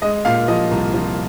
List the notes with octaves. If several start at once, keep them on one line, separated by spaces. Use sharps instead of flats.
G#3 D#5
A#2 F5
F3 D#5
C2
F3